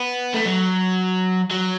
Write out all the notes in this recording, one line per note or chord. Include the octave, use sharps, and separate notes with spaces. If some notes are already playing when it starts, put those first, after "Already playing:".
Already playing: B3
A3
F#3
F#3